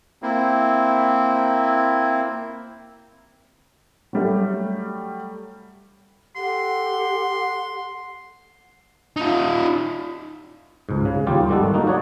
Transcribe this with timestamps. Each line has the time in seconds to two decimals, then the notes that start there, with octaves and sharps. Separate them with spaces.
0.22 A#3 C4 E4
4.13 F#3 G3 A3
6.36 G4 A4 F#5 C6
9.16 D#4 F4
10.89 C#2 G#2
11.05 C#3
11.27 D#2 G3 F4 G4 D5
11.49 G#1 D#3 G3 F#4 A4
11.74 A#3 D#4 F#4
11.86 F#3 F#4 C#5 D5